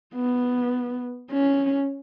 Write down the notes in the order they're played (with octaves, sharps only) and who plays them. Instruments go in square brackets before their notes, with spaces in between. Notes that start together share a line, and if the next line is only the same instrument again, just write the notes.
[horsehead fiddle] B3
C#4